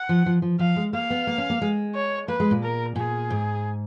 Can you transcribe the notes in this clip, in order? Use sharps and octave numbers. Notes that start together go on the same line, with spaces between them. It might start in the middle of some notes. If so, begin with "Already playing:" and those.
Already playing: F#5
F3
F3
F3
F3 F5
G#3
A#3 F5
B3
A#3
C#4
A#3
G#3
C#5
A#3 B4
G#3
A#2
A#4
A#2 G#4
G#2